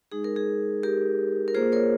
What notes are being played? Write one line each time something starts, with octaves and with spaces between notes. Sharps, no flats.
G#3 D#4 G#4
A#4
G#4
G4 A#4
A#4
A#3 F4 G#4 C5
A#4 C#5